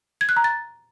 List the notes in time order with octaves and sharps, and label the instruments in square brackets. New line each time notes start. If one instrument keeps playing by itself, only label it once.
[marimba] G#6
F#6
A#5
A6